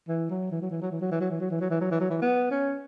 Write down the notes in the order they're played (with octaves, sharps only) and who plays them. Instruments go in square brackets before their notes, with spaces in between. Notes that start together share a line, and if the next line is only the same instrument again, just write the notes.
[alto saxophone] E3
F#3
E3
F#3
E3
F#3
E3
F#3
E3
F#3
E3
F#3
E3
F#3
E3
F#3
E3
F#3
E3
B3
C#4